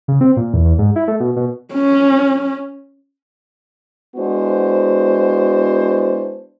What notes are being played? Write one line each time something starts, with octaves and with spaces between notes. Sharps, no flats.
C#3
C4
A#2
E2
E2
G#2
E4
A3
B2
B2
C#4
G#3 B3 D4 E4 F#4 C5